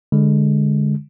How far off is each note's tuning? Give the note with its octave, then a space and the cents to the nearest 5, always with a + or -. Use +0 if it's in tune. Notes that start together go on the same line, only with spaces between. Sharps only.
D3 -5 G#3 -5